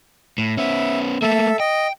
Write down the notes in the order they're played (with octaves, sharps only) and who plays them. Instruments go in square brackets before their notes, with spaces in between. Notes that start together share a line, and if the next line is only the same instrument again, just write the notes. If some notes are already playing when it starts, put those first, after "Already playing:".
[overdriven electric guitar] A2
[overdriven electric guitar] B3 C#4 [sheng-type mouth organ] E5
[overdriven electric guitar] A3 A#3 [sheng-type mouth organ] A4 E5
[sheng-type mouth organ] D#5 [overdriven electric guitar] G5